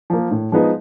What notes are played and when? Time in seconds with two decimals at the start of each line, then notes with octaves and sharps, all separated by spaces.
0.10 F3 A#3
0.31 A2
0.52 F3 G#3 B3 D#4